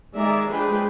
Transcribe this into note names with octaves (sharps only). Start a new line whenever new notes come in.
D#3 G#3 G#4 D5 E5 A#5
F3 G#3 D4 G#4 B4 G5